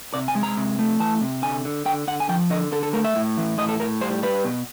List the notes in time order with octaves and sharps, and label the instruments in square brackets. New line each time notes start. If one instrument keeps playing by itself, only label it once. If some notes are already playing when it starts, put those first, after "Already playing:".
[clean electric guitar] C3 D5
G#5
G#3
A#5
C3
A3
E3 A5
C3
D3 G#5
D3
D3 G5
D3 F#5
G#5
F3 G5
D3 D#5
D3 A4
A4
A3 A#4
E5
A2
E3
A2 D#5
A4
A2 A#4
G3 C5
G3 B4
B2